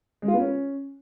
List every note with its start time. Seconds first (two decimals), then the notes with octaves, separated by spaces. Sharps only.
0.22 G#3
0.28 F4
0.34 B3
0.39 C#4